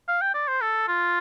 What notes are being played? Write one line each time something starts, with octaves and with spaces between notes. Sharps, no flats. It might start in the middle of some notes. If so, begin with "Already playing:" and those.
F5
G5
D5
C5
A4
F4